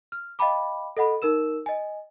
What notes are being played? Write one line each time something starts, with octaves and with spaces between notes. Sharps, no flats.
F6
D#5 F5 G5 A5 B5 D6
A4 D#5 F#5 B5
D#4 A#4 E6 E7
D#5 G#5